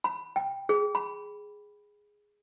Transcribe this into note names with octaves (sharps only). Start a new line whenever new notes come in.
B5
G5
G#4
B5